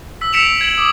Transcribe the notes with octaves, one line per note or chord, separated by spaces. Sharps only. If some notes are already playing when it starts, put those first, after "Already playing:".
E6 B6
E6 B6 C#7 D7 E7 F7
B6
G#6 F#7
D6 D#6